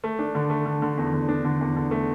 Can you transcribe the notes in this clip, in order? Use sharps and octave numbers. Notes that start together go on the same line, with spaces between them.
A3
D4
D3
A3
D3
D3
E2
D3
D4
D3
E2
D3
A3